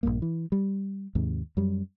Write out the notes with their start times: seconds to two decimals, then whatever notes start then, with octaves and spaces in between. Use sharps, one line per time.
0.03 A#1 E2 G2 A#3
0.22 E3
0.52 G3
1.15 D#2 G#2 C3
1.57 F#2 G3